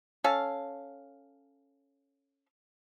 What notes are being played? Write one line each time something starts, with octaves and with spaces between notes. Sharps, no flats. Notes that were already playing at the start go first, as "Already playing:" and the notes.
C#4 A4 F5